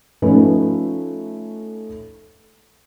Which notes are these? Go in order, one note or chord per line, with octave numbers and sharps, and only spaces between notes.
F3 A3 C#4 D#4 B4